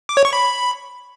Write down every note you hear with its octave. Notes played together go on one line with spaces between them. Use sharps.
D6
C#5
C#6
B5